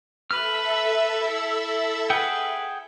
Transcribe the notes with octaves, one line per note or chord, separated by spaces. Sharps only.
A4 B4 E5 E6 F6
E4
G#4 B4 F#5 G5